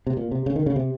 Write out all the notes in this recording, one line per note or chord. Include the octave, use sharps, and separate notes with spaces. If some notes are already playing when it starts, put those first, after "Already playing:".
C3
A#2
C3
C#3
D#3
C#3
C3